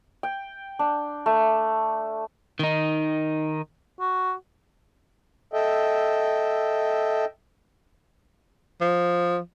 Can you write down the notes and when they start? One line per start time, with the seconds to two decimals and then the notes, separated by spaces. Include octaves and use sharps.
0.23 G5
0.79 D4
1.26 A3
2.59 D#3 D#4
4.00 F#4
5.53 A4 D#5 E5 G5
8.81 F3